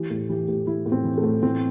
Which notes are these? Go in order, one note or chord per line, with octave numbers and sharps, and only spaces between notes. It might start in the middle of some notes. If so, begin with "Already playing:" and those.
Already playing: E3 G4
A2
E3 G4
A2 G4
E3 E4
A2
C4
E3
A3
A2
E3 C4